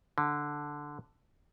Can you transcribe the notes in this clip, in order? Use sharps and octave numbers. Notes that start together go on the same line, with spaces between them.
D3